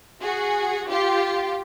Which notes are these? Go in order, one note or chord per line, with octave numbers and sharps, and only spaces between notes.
F#4 G#4
F4 G4